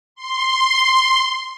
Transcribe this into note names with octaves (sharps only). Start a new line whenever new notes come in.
C6